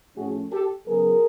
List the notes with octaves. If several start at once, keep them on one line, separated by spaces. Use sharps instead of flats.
A2 F3 A3 C#4 F#4 G#4
G4 A4
C#3 F#3 B3 G#4 A#4